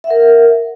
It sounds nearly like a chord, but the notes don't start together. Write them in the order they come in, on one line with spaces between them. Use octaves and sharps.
E5 F#5 A#4